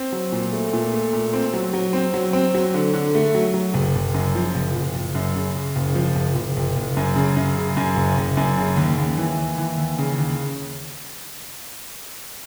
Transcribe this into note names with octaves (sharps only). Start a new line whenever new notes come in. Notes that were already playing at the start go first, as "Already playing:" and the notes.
Already playing: C4
F#3
A#2
A3
A#2
A3
A#2
C4
F#3
F#3
C4
F#3
C4
F#3
D3
D3
A3
F#3
F#3
F#1
F#1
F#2
F3
F#1
F#1
F#1
F#2
C#3
C#3
F#1
F3
F#1
F#1
F#1
F#1
F#2
C#3
F#2
C#3
F#2
F#1
F#1
F#2
C#3
D#2
D#2
E3
D#2
E3
D#2
C#3
D#2